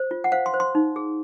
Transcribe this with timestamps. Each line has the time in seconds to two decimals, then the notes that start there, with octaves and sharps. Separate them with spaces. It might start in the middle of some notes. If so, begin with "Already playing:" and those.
Already playing: C5
0.11 F4
0.24 F#5
0.32 C5 F5
0.46 C6
0.54 C5
0.60 C6
0.75 D#4
0.96 G#4